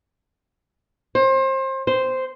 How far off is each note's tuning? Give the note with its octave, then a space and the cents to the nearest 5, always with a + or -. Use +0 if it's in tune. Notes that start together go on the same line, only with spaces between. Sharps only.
C5 +30
C5 -5